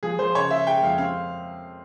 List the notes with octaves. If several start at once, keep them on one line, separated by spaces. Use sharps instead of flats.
F3 G#4
F3 C5
C#3 C#5
C#3 E5
G#3 G5
F2 F5
C4 F5